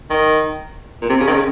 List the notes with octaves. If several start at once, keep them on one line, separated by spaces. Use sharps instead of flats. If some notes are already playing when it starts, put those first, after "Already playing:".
D#3
A#2
C3
C#3
D#3
C#3